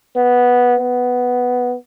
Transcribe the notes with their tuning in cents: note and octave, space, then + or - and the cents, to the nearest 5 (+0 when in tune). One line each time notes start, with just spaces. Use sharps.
B3 -5
B3 +5